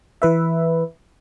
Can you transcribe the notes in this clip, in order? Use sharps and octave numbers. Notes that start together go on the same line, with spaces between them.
E3 B4 E5